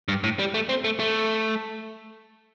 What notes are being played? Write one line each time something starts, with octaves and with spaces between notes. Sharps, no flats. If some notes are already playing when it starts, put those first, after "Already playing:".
G2
A2
G3
A3
C4
A3
A3